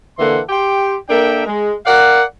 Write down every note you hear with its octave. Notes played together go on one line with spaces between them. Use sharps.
D3 E3 A#3 A4 F#5 C6
G4 G5 C6
A#3 D4 A4 A#4 E5 G5
G#3
A#4 D5 F5 F#5